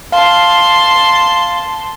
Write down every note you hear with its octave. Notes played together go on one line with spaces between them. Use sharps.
F5 A5 C6